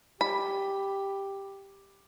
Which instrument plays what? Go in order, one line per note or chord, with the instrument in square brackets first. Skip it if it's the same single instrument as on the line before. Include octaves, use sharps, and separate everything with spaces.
[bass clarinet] G4 [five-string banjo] B5